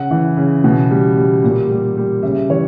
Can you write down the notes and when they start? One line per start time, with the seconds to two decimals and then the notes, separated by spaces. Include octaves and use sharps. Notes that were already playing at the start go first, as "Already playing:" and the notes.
Already playing: C#3 F#5
0.11 E3
0.37 C#3
0.64 B2
0.91 G3
1.17 G3
1.44 A#2
1.69 G3
1.97 G3
2.23 C#3 E5
2.49 E3 C#5